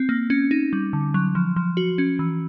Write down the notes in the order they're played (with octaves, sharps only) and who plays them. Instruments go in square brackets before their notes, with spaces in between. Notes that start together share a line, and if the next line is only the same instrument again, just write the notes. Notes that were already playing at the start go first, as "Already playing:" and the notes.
Already playing: [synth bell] C4
A#3
C#4
D#4
G3
D3
F#3
F3
F3
F#4
C#4
E3